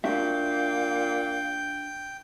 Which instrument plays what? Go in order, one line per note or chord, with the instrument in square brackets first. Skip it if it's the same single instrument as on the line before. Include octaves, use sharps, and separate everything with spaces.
[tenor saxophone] A#2 [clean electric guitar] D4 F#4 E5 [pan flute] F5 [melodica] G5